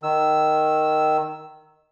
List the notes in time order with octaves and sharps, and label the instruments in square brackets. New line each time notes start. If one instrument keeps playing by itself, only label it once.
[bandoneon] D#3 E6